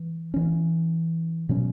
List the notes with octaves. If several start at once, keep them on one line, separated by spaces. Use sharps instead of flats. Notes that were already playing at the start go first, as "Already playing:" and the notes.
Already playing: E3
E3 C#4
B2 F#3 C#4